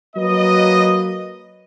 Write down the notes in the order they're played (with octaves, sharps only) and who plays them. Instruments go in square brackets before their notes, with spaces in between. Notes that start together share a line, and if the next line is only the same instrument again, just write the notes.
[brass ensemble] F#3 A#3 B4 D#5